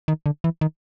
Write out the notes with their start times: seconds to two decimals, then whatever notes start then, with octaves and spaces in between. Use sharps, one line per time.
0.08 D#3
0.26 D3
0.44 E3
0.61 D#3